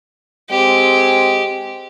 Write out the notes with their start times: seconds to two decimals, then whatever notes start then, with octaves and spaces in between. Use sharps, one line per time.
0.50 G#3 C4 G4